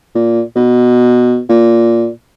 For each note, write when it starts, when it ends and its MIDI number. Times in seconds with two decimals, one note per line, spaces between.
0.15 0.42 46
0.55 1.40 47
1.49 2.09 46